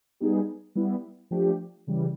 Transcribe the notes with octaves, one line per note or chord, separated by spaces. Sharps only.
G3 B3 D#4 G#4
G3 B3 E4
F3 A3 D4 G4
C#3 E3 G3